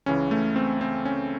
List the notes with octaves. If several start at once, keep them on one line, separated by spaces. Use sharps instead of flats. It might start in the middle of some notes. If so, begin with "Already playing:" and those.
C#2 C#3 E3 C#4
A3
C4
C4
C#4